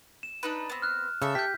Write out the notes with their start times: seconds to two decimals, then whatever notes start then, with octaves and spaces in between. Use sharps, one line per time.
0.23 E7
0.43 D4 D#4 B4
0.70 B3 C4
0.82 F6 F#6
1.22 C#3 A4 E5
1.35 G4 G6 B6